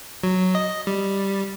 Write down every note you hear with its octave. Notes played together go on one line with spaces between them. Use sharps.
F#3
D#5
G3